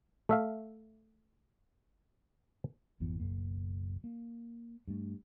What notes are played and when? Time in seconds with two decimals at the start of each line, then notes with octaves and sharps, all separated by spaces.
0.29 A3 E5 F5
3.00 G#1 F2 E3 B3
3.20 F#1 B1 F#2 A#3
4.04 A#3
4.88 G2 A3